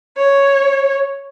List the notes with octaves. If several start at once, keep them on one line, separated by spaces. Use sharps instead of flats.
C#5